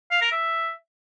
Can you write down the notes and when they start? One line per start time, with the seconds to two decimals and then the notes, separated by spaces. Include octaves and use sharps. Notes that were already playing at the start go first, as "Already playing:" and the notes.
0.11 F5
0.21 A#4
0.32 E5